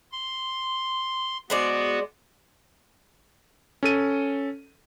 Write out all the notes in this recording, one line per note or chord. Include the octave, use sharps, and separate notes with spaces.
C6
G#3 B3 F#4 C5 D5
C#4 A4 D#7